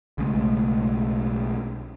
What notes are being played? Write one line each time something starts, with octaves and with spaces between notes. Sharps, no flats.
B1 C#3 G#3 A3